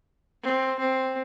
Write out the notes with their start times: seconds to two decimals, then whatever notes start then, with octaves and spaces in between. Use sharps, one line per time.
0.43 C4
0.79 C4